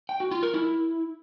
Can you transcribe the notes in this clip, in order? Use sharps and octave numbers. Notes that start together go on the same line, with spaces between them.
G5
F#4
F4
A#4
E4